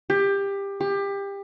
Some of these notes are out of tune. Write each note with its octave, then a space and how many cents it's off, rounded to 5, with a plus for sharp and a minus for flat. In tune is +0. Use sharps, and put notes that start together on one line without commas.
G4 +20
G4 +25